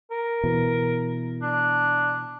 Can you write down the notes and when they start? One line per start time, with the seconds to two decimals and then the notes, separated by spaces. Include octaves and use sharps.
0.11 A#4
0.44 B2 E3
1.42 D4